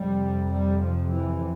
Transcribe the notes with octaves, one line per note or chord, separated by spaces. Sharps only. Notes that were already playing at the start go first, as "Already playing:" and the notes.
Already playing: F2 C3 G3
G3
F3
E3